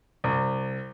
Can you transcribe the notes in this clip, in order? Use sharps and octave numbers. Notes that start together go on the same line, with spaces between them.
C2